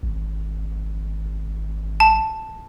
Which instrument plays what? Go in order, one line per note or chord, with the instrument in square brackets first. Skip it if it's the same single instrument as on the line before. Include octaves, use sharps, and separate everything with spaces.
[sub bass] G#1
[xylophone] A5